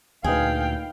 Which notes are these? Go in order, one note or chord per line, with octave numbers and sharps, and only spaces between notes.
D2 A#2 D#4 G#4 B4 F5 G5